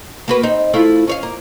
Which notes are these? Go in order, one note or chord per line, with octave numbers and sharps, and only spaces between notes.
A#3 F#4 B4
C4 D#4
A3 E4 F4
C#4 C#5 F5
A#3